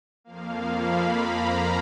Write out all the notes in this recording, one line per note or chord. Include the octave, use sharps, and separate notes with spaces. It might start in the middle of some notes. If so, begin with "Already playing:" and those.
F2 F3 A#3 F5
B5
A#5